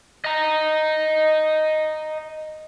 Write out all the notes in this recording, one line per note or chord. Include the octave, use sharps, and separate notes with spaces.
D#5 A#5